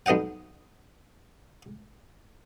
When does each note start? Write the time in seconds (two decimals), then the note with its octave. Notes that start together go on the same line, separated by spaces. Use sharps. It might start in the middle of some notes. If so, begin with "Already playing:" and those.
0.06 B1 B3 D#5 F#5 G5